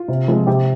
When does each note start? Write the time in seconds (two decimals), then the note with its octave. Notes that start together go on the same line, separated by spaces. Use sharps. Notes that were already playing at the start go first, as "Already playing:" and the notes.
Already playing: F4
0.08 C3
0.28 F3 G#3 C4
0.47 C3 G4